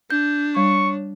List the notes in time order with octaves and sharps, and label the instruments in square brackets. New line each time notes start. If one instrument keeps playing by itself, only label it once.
[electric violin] D4 [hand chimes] G6
[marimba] G3 [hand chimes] C#5 [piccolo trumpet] C#6